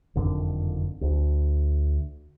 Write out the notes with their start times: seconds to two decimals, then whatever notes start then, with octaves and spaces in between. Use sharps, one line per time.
0.15 F#1 F2 D3 D#3
1.01 D2